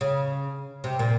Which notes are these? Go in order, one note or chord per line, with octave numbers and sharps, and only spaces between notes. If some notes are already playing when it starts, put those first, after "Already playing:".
C#3
C3
A#2